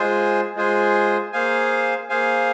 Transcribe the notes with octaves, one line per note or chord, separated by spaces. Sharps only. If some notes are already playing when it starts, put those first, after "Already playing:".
Already playing: G#3 F4 G#4 C5 G#5
G#3 F4 G#4 C5 G#5
A#3 G#4 C5 F5 G#5
A#3 G#4 C5 F5 G#5